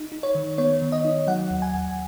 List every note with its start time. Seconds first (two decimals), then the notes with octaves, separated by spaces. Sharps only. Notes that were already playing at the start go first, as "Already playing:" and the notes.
Already playing: D#4
0.12 D#4
0.23 C#5
0.35 D#3
0.58 B3 C#5
0.82 D#3
0.92 D#5
1.05 D#4
1.27 F#3 F#5
1.51 D#2
1.62 G#5
1.74 D#2